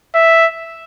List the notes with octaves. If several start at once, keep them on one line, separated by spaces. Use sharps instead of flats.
E5